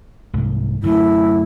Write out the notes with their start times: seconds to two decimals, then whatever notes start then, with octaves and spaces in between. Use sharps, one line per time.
0.33 C2 G#2
0.83 F#2 D3 A3 E4